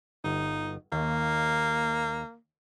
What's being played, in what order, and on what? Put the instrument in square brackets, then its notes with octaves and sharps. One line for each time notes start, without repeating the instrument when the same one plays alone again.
[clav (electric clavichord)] G1 [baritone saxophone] D#4
[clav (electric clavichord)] D#2 [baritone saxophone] A#3